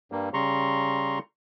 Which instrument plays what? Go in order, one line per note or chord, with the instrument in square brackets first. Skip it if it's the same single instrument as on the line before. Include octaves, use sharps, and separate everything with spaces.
[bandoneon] G2 G3 A#3
C#3 G3 A#5 C6 C#6